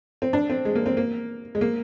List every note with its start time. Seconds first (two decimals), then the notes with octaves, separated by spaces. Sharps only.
0.22 C4
0.33 D4
0.49 C4
0.65 G#3
0.75 A#3
0.86 C4
0.97 A#3
1.55 G#3
1.61 A#3